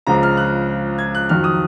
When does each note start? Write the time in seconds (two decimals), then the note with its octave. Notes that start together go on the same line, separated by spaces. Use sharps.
0.07 C#2 C#3 F3 A#5
0.23 F6
0.37 F#6
0.98 G#6
1.15 F#6
1.29 F2 D#3 F#3 F6
1.44 D#6